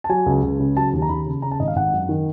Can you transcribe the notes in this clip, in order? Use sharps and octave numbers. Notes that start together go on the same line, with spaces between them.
A5
F#3 G#5
C#2
C#2
C#3
F#3 A5
D#2
A#5
D#2 B5
C#3
C#3 A#5
A5
G#1 D#5
F5
G#1 F#5
F#2
D#3